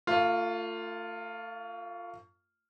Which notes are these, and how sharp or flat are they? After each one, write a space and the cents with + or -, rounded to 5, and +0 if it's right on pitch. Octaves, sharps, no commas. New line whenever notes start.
A3 +40 F4 +0